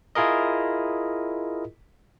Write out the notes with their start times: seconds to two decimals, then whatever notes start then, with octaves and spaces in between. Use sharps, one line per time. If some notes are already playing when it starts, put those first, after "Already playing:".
0.15 E4 F4 G#4 A#4 D#5